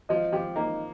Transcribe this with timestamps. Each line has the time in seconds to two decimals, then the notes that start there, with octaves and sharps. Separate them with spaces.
0.09 F3 D#5
0.33 F3 G4
0.56 A#3 D#4